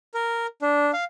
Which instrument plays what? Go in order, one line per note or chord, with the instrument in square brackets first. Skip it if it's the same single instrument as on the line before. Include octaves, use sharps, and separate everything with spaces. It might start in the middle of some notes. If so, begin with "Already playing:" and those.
[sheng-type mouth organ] A#4
D4
F5